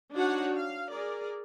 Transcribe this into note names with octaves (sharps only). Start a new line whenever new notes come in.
D4 D#4 F#4 C#5 F#5
F5
G#4 A#4 D5